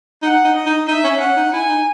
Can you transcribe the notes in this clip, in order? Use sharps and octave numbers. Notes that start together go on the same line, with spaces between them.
D#4 F#5
D#4
D#5
D#4
D#4 E5
C#4
C#4 F#5
D#4
E4 G#5
D#4